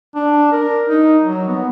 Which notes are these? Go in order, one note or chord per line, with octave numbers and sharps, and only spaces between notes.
D4
A#4
D#4
F#3
B3